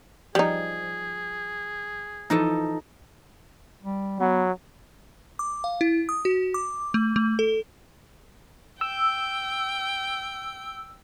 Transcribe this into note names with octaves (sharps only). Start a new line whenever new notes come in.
F3 G3 D#4 G#4
E3 F3 D#4 E4 A4
G3
F#3 B3
D6
F5
E4
D#6
F#4
D6
A3
A3
A4
G5 E6